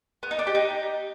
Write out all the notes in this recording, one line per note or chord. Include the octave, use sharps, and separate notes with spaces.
B3
D#4
D4
G4
D#4